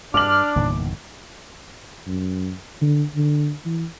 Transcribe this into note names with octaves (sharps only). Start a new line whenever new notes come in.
G2 D4 D6 F6 F#7
G1 E2 A#2 D#3
F#2
D3
D3
E3